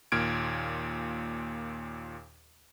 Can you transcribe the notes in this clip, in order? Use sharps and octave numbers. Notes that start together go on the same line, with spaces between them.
D#2 A#2 F6 G#6 D7